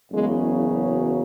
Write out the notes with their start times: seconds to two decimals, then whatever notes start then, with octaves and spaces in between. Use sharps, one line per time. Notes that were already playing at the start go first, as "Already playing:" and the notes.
0.12 F#1 E2 C#3 F#3 G#3